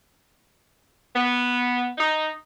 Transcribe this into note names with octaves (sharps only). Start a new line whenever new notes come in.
B3
D#4